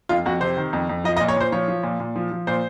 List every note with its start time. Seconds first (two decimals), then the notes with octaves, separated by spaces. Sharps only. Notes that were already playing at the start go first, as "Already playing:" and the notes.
0.09 F2 F4
0.26 F2 F#4
0.41 C3 C5
0.57 D#3
0.73 F2
0.89 F2
1.04 F3 D#5
1.17 D#5
1.20 A#2
1.28 C#5
1.36 A#2 C5
1.52 F3 C#5
1.68 F3
1.83 A#2
2.00 A#2
2.16 F3
2.31 F3
2.47 A#2 C5